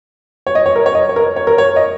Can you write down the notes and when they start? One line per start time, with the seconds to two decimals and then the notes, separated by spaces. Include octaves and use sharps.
0.47 C#5
0.55 D#5
0.66 C#5
0.76 A#4
0.86 C#5
0.95 D#5
1.09 C#5
1.16 A#4
1.36 C#5
1.47 A#4
1.58 C#5
1.76 D#5